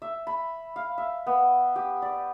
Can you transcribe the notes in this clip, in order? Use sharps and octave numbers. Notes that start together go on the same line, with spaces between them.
E5
B5
F5
E5
B3
G4
D5